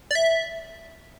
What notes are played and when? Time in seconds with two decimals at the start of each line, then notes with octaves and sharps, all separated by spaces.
0.11 D5
0.15 E5